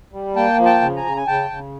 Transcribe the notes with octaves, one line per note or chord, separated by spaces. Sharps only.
G3
A#3 G5 A5
F3
G5 A5
C#3
G#5 A#5
C#3
G#5
C#3 G5 A5
C#3